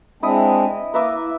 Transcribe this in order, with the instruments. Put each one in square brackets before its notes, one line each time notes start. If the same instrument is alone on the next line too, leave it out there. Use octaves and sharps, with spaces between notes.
[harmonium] G#3 C4 D4 [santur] E4 D#5
[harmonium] A#3 A#5 [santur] B4 E5 D6
[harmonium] E4